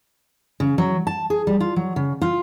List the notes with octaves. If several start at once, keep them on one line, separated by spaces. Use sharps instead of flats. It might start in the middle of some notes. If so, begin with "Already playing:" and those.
C#3
F#3
A5
G#4
G3
F4
F#3
C#3
F4